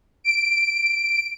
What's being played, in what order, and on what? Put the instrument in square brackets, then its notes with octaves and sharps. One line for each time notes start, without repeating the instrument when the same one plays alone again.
[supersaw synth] D7